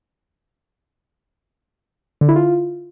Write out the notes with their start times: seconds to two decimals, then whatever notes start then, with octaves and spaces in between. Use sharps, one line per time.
2.21 D3
2.29 E4
2.36 F4